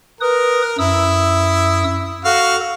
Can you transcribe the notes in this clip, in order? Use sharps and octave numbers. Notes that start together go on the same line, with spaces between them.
A#4 B4 D#6
F#2 E4 D#6 E6
F#4 A4 F5